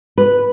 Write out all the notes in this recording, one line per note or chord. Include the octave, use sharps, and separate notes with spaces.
B4